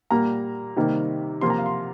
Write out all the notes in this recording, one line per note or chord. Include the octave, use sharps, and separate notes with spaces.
A#2 G3 A#3 A#5
C3 D#3 G3 A#3
C3 F3 A#3 C6
A#5
F5
C6